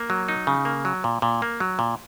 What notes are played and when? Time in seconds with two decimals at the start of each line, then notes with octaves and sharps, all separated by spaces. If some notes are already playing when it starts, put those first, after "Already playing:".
Already playing: A#3
0.10 F#3
0.28 D#4
0.47 C#3
0.65 A#3
0.85 F#3
1.04 A#2
1.22 A#2
1.42 A#3
1.60 F#3
1.79 A#2